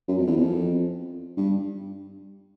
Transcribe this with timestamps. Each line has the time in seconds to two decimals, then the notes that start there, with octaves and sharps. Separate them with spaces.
0.08 F#2
0.18 F2
0.27 E2
0.37 F2
1.37 G2